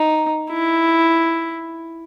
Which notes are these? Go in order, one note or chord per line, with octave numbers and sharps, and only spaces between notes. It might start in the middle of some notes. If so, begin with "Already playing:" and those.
Already playing: D#4
E4